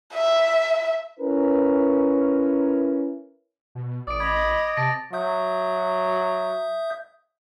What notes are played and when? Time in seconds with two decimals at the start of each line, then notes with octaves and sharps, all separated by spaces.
0.14 E5
1.19 C#4 E4 A#4 B4
3.75 B2
4.07 A1 D5 D#6 D7
4.20 D#5 B5 D6 G#6
4.77 C3 A5 A6 A#6 D7
5.13 F#3 E5 D#6 G6